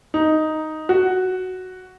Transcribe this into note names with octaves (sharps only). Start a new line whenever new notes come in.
D#4
F#4